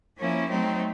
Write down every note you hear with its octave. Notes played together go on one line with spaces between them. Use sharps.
F3 A#3 C#4 E4
F#3 A3 C4 D#4